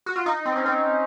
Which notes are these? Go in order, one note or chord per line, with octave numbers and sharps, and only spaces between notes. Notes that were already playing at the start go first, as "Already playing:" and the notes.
F#4
F4
D#4
C4
C#4
C4